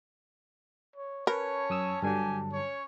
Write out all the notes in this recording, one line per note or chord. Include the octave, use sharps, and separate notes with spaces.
C#5
C#4 A#4 B4 C#5 A5
F#2 D#6 E6
G2 D3 F#3 G4 G#5
C#4 C#5